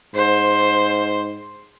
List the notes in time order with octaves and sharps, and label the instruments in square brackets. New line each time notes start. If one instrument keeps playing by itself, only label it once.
[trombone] G#2 [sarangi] C5